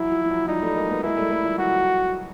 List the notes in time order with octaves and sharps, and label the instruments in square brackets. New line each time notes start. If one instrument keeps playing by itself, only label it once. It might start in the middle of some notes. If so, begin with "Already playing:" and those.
Already playing: [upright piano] E3 F#3 [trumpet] E4
[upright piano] F3
F3
E3 F#3
[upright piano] F3 G3 [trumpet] D#4
[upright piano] G3 A3
G#3 A#3
A3 B3
[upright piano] G#3 A#3 [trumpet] E4
[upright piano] G3 A3
G3 A3
F3 G3
[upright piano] E3 F#3 [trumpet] F#4